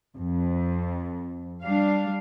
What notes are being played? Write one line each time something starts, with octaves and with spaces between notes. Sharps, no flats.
F2
G3 D4 F5